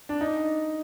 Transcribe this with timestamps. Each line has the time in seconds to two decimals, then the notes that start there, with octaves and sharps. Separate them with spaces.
0.09 D4
0.21 D#4